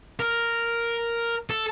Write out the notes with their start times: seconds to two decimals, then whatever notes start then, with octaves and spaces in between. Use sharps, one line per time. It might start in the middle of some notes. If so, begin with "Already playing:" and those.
0.20 A#4
1.50 A4